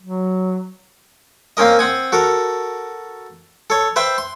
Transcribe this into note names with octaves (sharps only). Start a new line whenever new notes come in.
F#3
A#3 C4 C#4 A#4 D#5
C4 F#5 G#5
F#4 A4 A#4
A4 C#5
B4 C5 E5 G5
C6